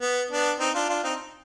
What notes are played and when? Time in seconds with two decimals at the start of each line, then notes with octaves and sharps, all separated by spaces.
0.02 B3
0.31 B3 D4
0.60 C4 D#4
0.74 D4 F4
0.89 D4 F4
1.04 C4 D#4